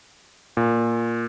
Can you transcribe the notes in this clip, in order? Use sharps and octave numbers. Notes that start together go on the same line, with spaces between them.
A#2